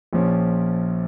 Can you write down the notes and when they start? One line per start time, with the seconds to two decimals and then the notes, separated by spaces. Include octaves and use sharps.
0.13 A#1 A#2 F3 C#4